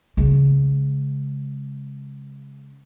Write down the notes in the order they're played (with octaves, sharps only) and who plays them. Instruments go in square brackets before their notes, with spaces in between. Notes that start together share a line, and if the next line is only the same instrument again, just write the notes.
[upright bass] C#3 G#3